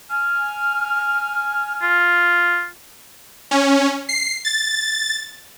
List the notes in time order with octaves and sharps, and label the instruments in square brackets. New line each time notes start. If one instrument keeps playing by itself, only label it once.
[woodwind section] G#5 F6
[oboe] F4
[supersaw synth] C#4
C7
A6